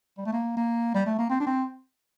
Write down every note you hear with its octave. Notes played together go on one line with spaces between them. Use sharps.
G3
A3
A#3
A#3
G3
A3
A#3
C4
D4
C4